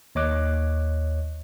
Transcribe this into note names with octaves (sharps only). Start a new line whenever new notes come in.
D#2 C#5 D#5 D6 F#6